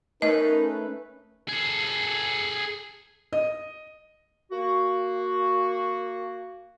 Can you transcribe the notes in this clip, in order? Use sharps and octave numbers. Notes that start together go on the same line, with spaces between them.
A3 C#4 D#4 A#4 B4 D#5
G#4 A4
D#5
A#3 F#4